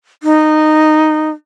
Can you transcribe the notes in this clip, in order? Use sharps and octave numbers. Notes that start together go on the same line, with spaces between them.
D#4